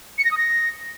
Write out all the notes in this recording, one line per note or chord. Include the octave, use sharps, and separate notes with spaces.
C#7
A#6
D#6
A#6